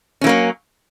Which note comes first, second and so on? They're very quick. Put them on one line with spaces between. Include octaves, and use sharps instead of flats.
C#4 E3 A#3 F#3